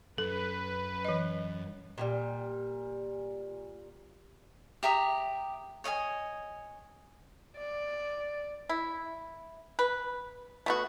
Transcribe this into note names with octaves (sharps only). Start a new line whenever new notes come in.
F#2 A4 B4
E3 D#5
A#2 D#3 G3
G4 E5 A#5 D#6
C#5 D#5 E5 G#5
D5
E4
B4
A3 B3 F#4